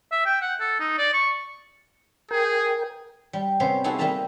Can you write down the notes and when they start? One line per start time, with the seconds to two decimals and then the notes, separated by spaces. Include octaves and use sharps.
0.12 E5
0.26 G5
0.42 F#5
0.60 A4
0.80 D#4
0.98 D5
1.14 C#6
2.31 G#4 A#4 G5
3.33 G3
3.60 C3 B3 C#4 C5
3.84 C4 D#4 E4 F#4 G#4 A4
3.99 G3 A#3 D#5 E5 A5 A#5